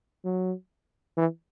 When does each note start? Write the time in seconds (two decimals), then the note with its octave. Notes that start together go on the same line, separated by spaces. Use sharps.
0.24 F#3
1.17 E3